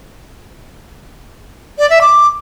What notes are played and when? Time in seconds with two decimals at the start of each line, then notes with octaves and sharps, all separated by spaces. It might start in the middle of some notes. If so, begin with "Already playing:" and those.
1.79 D5
1.90 E5
2.01 D6